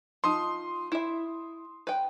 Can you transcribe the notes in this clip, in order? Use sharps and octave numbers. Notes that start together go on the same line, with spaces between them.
F3 D#4 C6 D#6
E4 E5
B4 G5